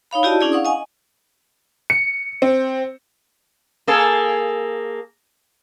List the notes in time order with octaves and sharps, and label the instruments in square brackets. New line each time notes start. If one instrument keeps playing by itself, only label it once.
[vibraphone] D#4 C#5 F5 B5
E4 F#4 G4 D5 D#5 A5
C#4 D4 E4 G#4 D5
F5 F#5 C#6 D#6
D#5 G#5
[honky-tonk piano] C#7
C4
[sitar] A#3 G#4 A4